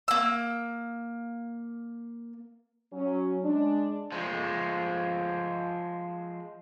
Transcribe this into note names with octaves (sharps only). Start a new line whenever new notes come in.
A#3 E6
F#3 C#4
G#3 D4
F3 G#3